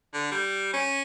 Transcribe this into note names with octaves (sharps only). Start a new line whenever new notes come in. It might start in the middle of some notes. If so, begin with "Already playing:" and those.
D3
G3
C#4